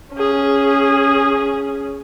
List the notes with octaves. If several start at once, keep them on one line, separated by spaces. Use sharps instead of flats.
C#4 G#4